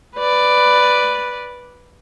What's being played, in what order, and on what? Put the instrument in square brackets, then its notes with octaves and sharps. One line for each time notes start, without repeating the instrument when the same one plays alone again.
[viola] B4 D5